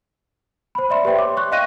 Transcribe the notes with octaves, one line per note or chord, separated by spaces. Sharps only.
C5 B5
D5 E5 C6
G4 B4 C5 E5 G5 C6
C#5 D6
C#6 F#6
D#5 F5 G5 F#6 A#6 D#7